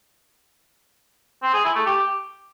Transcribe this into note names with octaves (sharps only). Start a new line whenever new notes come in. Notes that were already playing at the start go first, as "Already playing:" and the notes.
C4
G#4
E4
A3
G4